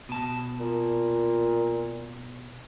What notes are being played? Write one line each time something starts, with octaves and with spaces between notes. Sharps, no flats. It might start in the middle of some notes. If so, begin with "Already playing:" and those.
B2 A5
A#2